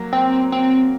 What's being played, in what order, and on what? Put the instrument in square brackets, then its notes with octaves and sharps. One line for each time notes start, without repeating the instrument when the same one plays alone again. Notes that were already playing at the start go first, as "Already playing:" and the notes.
Already playing: [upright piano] F#3 A#3
[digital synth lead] C4
C4